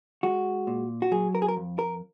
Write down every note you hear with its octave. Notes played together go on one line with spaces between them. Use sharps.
G#3 F#4
A#2
F#4
F#3 G#4
A#4
G#4
A#4
F2
A#4